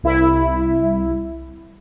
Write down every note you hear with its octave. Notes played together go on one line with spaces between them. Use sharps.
C2 E4